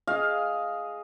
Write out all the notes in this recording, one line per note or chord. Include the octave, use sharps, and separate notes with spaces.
G#4 D#5 F5